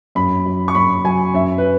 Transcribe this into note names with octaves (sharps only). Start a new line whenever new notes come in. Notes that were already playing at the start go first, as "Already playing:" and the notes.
F#2 B5
F#3
C#6
F#2 B5
F#3 G#5
F#2 E5
B4